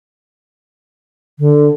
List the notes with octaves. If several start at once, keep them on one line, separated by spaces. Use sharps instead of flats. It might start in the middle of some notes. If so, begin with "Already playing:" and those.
D3